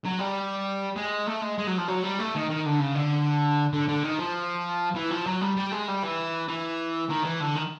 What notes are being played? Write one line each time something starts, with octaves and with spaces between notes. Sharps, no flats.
F#3
G3
G#3
A3
G#3
G#3
F#3
F3
F#3
G3
A3
D#3
D#3
D3
C#3
D3
D3
D3
D#3
F3
E3
F3
F#3
G3
G3
G#3
G3
E3
E3
D#3
E3
D3
D#3